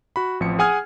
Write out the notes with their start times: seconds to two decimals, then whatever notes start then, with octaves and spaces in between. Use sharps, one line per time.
0.16 F#4 B5
0.40 A1 F3 C4 C#7
0.59 G#4 F#5 G#5 D#6 F6 G#6